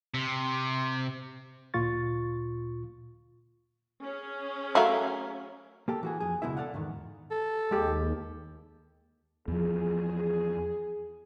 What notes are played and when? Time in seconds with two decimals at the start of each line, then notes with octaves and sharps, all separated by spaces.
0.14 C3
1.74 D2 A#2 F4 C#6 A6
4.03 C#4 G#4
4.75 F#3 A3 F#4 A#4 E5 F5
5.88 A#3 G4 A4
6.03 E3 F#4 G#4
6.20 F2 G#4
6.42 C#2 B2 G#3 E4 E5
6.57 A4 D5 F5 F#5
6.74 E2 G#2 D#3
7.31 A4
7.71 D#2 G#3 G4
9.48 E2 F3 G#4